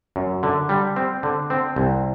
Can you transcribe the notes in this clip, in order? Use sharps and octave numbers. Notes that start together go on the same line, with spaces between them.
F#2
D3
G3
C4
D3
C4
C2